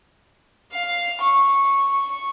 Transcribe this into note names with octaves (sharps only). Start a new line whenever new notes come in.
F5
C#6